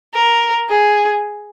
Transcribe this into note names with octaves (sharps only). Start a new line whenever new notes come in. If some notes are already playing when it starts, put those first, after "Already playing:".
A#4
G#4